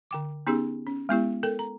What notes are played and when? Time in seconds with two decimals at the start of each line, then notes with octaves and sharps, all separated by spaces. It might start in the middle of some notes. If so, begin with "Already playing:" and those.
0.11 D3 G5 D6
0.47 B3 C#4 D#4 G4 G#4
0.87 C#4
1.09 G#3 B3 E4 G4
1.43 A4 A#4 G5
1.59 A#5